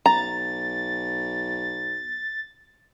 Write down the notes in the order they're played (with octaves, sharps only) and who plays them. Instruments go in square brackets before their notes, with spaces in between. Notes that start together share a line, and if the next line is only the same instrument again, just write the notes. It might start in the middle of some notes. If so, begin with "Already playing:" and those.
[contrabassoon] B1 [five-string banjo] A#5 [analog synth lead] A6